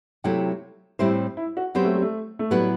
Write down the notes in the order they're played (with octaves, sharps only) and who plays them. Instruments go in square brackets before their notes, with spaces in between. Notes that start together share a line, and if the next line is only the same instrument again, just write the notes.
[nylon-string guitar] C3 F#3 A3 E4 A4 [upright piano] G4
[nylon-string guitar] A2 G3 C4 G4 C5 [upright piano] E4
[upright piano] E4
F#4
[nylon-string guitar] F#3 C4 G4 C5 [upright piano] B3
[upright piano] A3
G3
A3
A3
[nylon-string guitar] A2 F#3 B3 E4 B4 [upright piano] G3